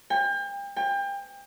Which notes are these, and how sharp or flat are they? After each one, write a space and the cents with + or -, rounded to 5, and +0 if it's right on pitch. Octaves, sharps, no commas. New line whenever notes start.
G5 +35
G5 +30